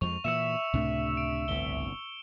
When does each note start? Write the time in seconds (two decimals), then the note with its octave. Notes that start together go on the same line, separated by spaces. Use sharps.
0.01 F2 F3 G#3 C#6 F7
0.24 A#2 E3 E5 E6 C#7 E7
0.73 C#2 A2 C3 A3 D4
1.17 D7
1.48 G1 C2 G7